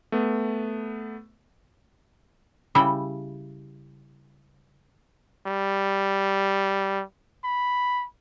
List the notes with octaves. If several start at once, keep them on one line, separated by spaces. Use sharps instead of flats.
A3 B3
C#3 G3 E4 G5
G3
B5